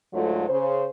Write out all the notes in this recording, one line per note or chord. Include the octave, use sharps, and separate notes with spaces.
D2 G#2 F#3 A3 F4
C#3 C5